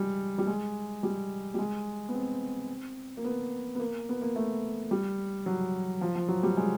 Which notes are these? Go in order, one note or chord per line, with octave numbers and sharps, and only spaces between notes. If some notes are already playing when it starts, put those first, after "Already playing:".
Already playing: G3 G#3
G3
G#3
G3
G3
G#3
B3
C4
A#3
B3
B3
A#3
B3
A#3
A3
G3
F#3
F3
F3
F#3
G3
G#3